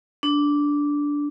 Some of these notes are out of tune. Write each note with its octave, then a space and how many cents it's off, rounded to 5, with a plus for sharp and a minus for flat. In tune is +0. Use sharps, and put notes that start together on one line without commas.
D4 -10